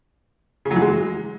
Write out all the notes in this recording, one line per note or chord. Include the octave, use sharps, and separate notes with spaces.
C#3
F#3
E3
G#3